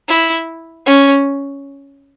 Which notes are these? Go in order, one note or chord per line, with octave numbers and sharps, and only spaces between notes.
E4
C#4